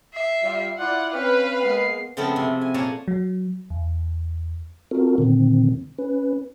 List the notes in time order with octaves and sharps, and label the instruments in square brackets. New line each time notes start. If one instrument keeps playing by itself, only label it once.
[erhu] E5 [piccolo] C7
[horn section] G3 F4
[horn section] E4 F4 D5 [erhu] F#5 [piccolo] F#6
[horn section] C4 C#4 G5 [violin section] B4 [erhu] F5 [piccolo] F#6
[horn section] G#3 A#3 B3 [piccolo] C7
[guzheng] C#3 F3 A3 B3 C4 A4
C3
G#5
A#2 A#3 C#5 G#5 A5
[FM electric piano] F#3
E2
[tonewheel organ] C4 F4 F#4 A4 A#4
A#2 D3 D#3 C4
C#4 B4